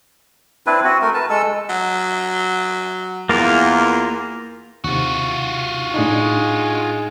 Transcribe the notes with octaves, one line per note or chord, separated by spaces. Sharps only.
C4 D4 E4 B4
C4 F#4
A3 A#4
B4 A5
G#3 A4 E6
F#3
E2 A#3 F4 A#4
D#2 C3 F4 F#4
A2 G#3 D4 D#4